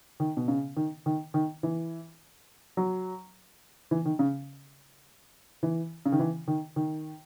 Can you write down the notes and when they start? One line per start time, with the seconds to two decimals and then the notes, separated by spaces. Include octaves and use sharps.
0.20 D#3
0.37 B2
0.48 C#3
0.77 D#3
1.06 D#3
1.34 D#3
1.63 E3
2.77 F#3
3.91 E3
4.05 D#3
4.19 C#3
5.63 E3
6.06 C#3
6.12 D#3
6.19 E3
6.48 D#3
6.76 D#3